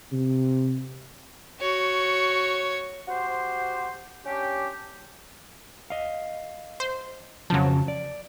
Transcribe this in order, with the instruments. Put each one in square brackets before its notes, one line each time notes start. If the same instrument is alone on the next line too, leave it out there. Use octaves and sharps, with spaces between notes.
[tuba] C3
[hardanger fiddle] F#4 C#5
[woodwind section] F#4 G4 C5
C#4 D4 G4
[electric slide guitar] D#5 F5
[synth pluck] C5
[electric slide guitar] F2 C#3 A5 [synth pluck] F3 F#3
[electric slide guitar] D5